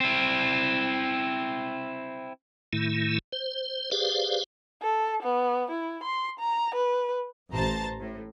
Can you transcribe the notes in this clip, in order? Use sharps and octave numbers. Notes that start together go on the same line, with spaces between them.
C4 E4
A2 D#3 A3 E4
C5
G4 G#4 B4 C5 D5 F5
A4
B3
E4
C6
A#5
B4
A1 C5 A5 A#5 A6
A2